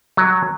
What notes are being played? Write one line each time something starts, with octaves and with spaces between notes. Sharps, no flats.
F#3